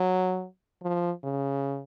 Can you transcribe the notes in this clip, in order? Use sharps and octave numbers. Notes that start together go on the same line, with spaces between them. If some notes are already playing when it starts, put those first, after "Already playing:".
Already playing: F#3
F3
C#3